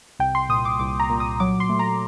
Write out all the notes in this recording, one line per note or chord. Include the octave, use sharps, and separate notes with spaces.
C2 G5
C6
A#2 D#6
D6
C2 D6
A#5
A#2
D#6
F#3 D6
C6
A3
A#5